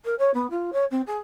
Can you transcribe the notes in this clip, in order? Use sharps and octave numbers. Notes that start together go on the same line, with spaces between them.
A#4
C#5
B3
F4
C#5
C4
G#4